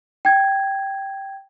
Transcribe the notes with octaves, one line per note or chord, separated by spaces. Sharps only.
G5 G#6